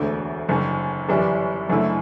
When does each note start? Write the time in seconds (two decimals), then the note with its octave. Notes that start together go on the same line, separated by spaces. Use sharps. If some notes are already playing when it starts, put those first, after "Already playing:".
Already playing: E1 D2 D3 A3
0.49 F#1 F#2 D3
1.09 G1 F#2 E3 G3 D4
1.69 F#1 F#2 D3 A3 E4